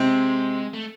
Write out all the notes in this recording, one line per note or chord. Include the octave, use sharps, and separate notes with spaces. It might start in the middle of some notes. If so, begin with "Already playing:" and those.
Already playing: C3 G#3 C4
A3